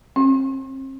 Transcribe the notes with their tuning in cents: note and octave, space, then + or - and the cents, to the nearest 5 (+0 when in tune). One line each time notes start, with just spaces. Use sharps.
C4 +40